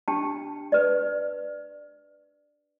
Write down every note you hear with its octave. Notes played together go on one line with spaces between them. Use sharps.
D4 G4 G5 A5
B4 D5